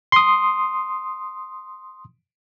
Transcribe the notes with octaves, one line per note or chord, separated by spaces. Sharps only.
C6 D#6